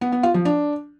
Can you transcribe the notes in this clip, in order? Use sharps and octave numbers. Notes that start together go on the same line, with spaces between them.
B3
B3
F4
F3
D4